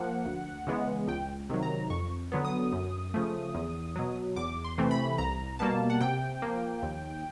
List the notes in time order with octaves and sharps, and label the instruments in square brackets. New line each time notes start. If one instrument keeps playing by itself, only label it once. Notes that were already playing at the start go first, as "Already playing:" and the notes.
Already playing: [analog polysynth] F3 A#3 F#5
D2
C#3 E3 G#3 B3
C#2 G5
C3 D#3 F#3
A#5
F2 C#6
D3 F#3 B3
D#6
F#2
C#3 F3 A3
E2
B2 F#3
E2 D6
C6
C3 E3 A3 C4
B5
C2 A#5
B2 G3 A#3 A5
F#5
C3 G5
F3 A#3
D#2